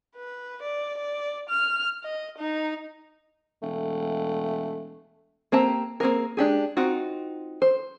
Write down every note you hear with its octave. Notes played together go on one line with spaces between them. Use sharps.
B4
D5
D5
F6
D#5
D#4
E1 A3
A#3 C4 G4 A5 A#5
A#3 C4 G#4 A#4
G#3 D4 G4 G#4
C4 D#4 F4 F#4
C5